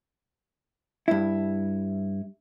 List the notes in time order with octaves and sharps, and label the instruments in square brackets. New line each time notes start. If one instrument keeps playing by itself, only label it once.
[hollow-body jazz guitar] G2 E4